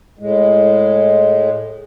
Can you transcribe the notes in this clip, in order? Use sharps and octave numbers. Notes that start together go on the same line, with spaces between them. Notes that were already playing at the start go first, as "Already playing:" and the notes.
A2 G#3